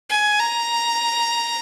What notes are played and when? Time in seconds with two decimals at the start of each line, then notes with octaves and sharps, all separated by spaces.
0.10 G#5
0.39 A#5